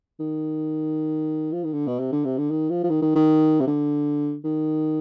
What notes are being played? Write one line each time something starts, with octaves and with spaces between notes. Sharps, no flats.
D#3
F3
D#3
D3
B2
C3
D3
C3
D3
D#3
F3
F3
D#3
D#3
D#3
C3
D3
D#3